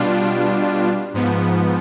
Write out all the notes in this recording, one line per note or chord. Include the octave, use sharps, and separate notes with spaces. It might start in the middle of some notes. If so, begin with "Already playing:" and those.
Already playing: B2 G3 D4 F4
G#2 F3 B3